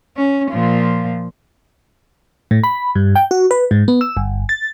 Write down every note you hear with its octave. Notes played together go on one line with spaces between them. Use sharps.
C#4
A#2 F3
A2
B5
G2
G5
F#4
B4
G#2
B3
E6
G1
A6